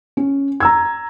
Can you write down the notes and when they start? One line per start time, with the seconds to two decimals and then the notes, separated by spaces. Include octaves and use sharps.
0.17 C#4
0.60 A#5 E6 G#6